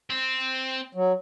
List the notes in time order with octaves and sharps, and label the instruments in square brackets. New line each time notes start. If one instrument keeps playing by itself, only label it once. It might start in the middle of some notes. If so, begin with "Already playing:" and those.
[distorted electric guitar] C4
[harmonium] F#3